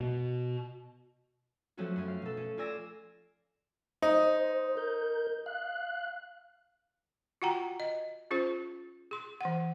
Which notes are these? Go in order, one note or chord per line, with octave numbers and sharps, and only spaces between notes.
B2
F3 F#3 A3 C4 C#4 F#4
F#2 C#4
F5
B2 A4
C#4
F4 D5 G#5 E6 A#6
D#4 C5
A#4 G6
F5 F#6
F4 F#4 F#5 G5 A#5
D#5
C#4 F4 G#4 C5
G#4 C6
E3 F#5